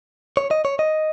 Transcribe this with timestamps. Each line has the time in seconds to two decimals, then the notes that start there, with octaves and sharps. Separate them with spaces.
0.37 C#5
0.51 D#5
0.65 C#5
0.79 D#5